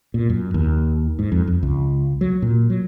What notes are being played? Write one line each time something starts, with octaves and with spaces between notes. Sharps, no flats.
A#2
F#2
D#2
G#2
F2
F2
C#2
F#3
A#2
F#3